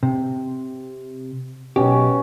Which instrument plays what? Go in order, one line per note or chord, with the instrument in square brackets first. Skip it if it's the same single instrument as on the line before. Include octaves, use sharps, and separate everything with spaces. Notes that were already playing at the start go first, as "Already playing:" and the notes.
[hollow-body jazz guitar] C3
[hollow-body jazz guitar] B1 F2 G4 [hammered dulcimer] B2 C#4